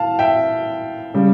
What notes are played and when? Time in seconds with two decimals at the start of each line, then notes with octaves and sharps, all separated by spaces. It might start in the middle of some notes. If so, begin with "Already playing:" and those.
Already playing: E3 F5 A5
0.19 E5 G5
1.14 C#3 G3